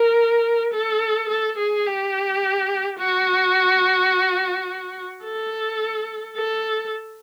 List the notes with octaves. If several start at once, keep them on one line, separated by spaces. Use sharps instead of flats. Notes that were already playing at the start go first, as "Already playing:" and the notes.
Already playing: A#4
A4
A4
G#4
G4
F#4
A4
A4